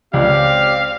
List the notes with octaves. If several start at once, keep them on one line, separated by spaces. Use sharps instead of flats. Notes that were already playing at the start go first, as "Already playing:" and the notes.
C#2 C4 G4 D5 F5